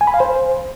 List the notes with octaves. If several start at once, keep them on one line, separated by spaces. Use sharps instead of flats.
G#5
B5
F5
C5